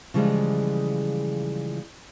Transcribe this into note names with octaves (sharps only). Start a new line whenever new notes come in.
C#3 E3 F3 G3 G#3 F4